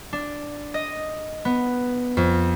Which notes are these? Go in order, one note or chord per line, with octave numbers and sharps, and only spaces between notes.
D4
D#5
B3
F2